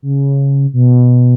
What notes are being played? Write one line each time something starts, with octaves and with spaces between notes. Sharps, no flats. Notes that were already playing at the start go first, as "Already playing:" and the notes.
C#3
B2